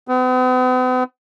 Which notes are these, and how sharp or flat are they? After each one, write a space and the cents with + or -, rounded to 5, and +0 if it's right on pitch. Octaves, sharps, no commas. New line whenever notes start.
B3 +45